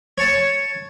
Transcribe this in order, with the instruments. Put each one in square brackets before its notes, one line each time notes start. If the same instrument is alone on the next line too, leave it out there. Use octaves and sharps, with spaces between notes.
[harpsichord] C#5 A5